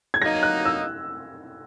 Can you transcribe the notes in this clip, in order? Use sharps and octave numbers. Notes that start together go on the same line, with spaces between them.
G#6
F#3 A#3 D#4 A#6
F#6
E6